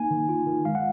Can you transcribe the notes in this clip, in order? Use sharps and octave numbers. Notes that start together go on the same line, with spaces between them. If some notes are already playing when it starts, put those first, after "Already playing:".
Already playing: A#3 D#4 G#5
D#3
F4
D#3
G#3 F5
F#5